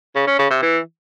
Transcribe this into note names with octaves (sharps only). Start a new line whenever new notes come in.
C#3
C#4
C#3
C3
E3